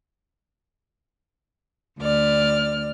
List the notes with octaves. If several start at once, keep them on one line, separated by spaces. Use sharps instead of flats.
D2 D5 F6